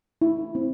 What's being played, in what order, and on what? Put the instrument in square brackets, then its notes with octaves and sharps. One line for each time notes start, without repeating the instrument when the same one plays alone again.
[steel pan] E4
C4